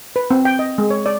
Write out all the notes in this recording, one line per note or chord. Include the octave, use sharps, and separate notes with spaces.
B4
C4
G5
D#5
G#3
C#5
D5